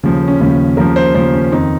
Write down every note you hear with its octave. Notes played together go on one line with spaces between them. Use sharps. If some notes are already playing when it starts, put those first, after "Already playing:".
D#2 C#3 F3
C#4
D#2 C#3 F3
D#2 C#3 F3 A#4
C5
D#2 C#3 F3 C5
C#4
F2 D#3 D#4